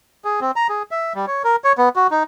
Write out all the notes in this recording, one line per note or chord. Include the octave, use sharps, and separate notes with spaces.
G#4
C4
A#5
G#4
E5
G3
C#5
A#4
C#5
B3
F#4
D#4